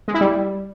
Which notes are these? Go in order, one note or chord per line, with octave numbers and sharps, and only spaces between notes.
G#3
E4
G3